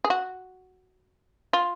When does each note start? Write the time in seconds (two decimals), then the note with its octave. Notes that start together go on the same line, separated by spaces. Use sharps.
0.04 G#4
0.10 F#4
1.53 F4